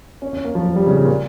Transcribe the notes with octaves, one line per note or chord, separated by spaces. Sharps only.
C#4
C#4
A#3
F3
F3
G3
C#3
C#3
A#2